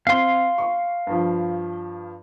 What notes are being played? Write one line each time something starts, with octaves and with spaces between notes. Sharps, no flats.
C4 F5 C6
C#6
G2 F3